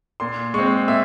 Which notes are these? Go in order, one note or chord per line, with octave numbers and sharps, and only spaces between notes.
A#2 C6
G#3 C4 C#6
A#2 E5